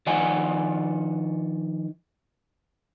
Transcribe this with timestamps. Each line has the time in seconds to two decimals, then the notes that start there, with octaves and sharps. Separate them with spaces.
0.07 D#3 F3 D5 F#5 G#5